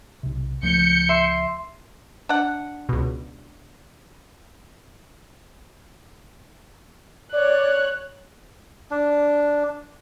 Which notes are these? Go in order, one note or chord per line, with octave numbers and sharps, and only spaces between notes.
B1 C3
C#2 F3 A3 G6 C#7
E5 C6
D4 F#5
C#2 B2
C#5 D5 F#6
D4